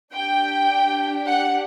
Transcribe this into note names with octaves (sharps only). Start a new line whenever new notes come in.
D4 G4 G5
F#5